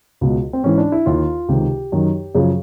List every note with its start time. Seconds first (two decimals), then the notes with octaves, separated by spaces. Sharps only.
0.21 C#2 B2
0.53 C4
0.63 G#2 E3 C#4
0.78 D4
0.92 E4
1.06 D#2 D#3 F4
1.48 C#2 C3 D#3 G4
1.92 F#2 D#3
2.34 F#2 C#3 F3 G#4